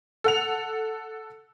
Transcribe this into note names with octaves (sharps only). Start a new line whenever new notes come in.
A4 F#5 F7